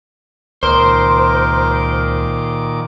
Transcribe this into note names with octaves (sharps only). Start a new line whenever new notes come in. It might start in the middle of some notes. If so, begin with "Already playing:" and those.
C#2 A#2 D#3 A#4 C5 D6